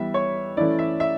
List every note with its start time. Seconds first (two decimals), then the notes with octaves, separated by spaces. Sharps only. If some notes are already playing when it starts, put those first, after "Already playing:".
Already playing: E3 G3 B3 E5
0.14 C#5
0.57 E3 A3 C#4 E4 D5
0.79 E5
1.00 E5